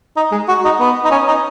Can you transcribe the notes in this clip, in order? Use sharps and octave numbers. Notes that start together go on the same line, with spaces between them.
D#4
G#3
F#4
D#4
B3
D#4
C#4
D#4